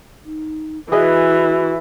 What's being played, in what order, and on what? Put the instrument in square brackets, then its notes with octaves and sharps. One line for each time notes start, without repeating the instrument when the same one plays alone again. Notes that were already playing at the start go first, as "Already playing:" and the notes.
[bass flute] D#4
[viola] E3 [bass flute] F#4 [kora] G#4 B4 D#5 [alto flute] E5